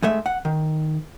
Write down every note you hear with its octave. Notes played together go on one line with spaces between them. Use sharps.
G#2 G#3 A3 E5
F#5
D#3